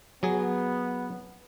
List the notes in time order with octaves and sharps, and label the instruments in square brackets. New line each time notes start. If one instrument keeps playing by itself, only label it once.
[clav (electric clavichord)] F#3 G#4 [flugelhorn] B3